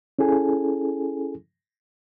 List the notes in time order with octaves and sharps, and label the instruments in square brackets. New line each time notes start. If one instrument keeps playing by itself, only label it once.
[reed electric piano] C#4 E4 G#4 A4 G#5